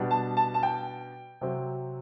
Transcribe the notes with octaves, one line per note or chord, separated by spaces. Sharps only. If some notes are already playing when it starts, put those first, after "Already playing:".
Already playing: B2 G3 B3 D4
A5
A5
A5
G5
C3 F#3 C4